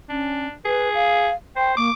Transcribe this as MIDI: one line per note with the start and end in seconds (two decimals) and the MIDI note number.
0.09 0.46 61
0.09 0.53 62
0.65 1.28 68
0.65 0.89 71
0.95 1.35 77
1.56 1.77 72
1.56 1.75 79
1.77 1.89 58
1.77 1.93 86